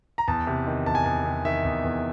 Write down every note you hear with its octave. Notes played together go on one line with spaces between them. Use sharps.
A#5
E2 A5
C3
D#3
E2 A5
G#5
E2 A5
C3
D#3 E5
E2
E2